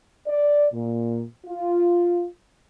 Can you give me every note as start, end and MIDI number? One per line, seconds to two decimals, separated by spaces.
0.26 0.66 74
0.72 1.22 46
1.45 2.25 65